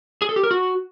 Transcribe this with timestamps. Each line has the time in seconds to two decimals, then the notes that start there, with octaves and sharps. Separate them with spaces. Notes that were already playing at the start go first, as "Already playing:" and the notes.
0.22 G#4
0.29 A4
0.36 G4
0.43 A#4
0.51 F#4